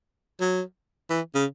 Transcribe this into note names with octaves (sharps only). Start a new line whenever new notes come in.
F#3
E3
C#3